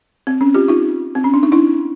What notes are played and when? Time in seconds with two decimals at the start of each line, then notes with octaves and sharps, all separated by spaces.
0.27 C4
0.41 C#4
0.54 F4 G4
0.68 D#4 F4
1.15 C4
1.24 C#4
1.34 D4
1.43 D#4
1.52 D4 E4